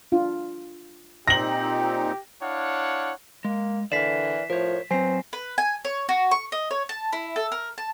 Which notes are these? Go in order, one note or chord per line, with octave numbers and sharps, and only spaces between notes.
D4 F4
A#2 C4 D#4 G4 A#6 F#7
D4 E4 C#5 F5 F#5
G#3 A#3
D3 E3 A#4 D5 B6 C7 E7
A2 F3 A#4 C#5
F#3 B3 C4 C5 G#5 C7
B4
G#5
C#5
F#4
C#6
D#5
C#5
A5
E4
A4
A#4
A5